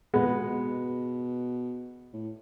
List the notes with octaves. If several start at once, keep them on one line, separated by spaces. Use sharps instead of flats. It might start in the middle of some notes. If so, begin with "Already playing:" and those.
B2 G#3 B3
A2